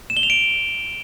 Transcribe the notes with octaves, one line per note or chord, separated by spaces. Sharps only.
E7
G7
F7
D7